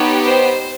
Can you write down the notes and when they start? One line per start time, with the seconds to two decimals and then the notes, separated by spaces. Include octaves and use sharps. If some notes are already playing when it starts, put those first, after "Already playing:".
Already playing: B3 D#4 G4 C#5
0.24 C5